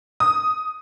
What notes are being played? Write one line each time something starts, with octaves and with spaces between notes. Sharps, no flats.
D#6